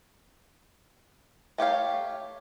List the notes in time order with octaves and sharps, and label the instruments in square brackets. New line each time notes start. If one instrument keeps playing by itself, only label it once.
[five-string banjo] A3 G4 C#5 F5